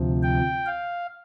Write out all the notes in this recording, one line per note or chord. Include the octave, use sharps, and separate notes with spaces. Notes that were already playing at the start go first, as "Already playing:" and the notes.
Already playing: D2 C3 F3
G5
F5